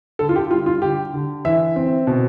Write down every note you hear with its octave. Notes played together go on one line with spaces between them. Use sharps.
D3 A4
F4
G4
G3 F4
F4
D3 G4
D3
E3 E5
C4
B2